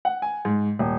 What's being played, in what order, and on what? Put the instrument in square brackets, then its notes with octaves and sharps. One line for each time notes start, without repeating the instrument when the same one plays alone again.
[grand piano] F#5
G#5
G#2
D#1